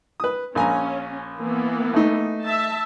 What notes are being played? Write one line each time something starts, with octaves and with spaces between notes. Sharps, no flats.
B4 D#6
A#1 C#4 G#5 A#5
E3 A#3 B3
A3 D#4
E5 A5